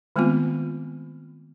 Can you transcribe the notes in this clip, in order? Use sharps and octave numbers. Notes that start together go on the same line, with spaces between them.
D#3 G#3 A3 B3 C4 F4